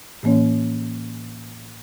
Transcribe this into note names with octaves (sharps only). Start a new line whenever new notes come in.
A2 E3 A#3 C#4 C#5